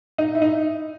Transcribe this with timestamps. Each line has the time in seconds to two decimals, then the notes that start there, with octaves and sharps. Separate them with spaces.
0.18 D#4
0.35 E4
0.42 D#4